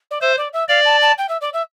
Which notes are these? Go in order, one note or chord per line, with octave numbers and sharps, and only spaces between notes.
D5
C5 E5
D5
E5
D5 F5
A5
A5
G5
E5
D5
E5